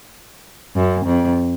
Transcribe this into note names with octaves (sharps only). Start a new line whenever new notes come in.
F#2
F2